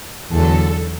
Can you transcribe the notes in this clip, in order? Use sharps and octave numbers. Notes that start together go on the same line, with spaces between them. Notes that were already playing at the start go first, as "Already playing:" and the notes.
E2 D3 F#3 A4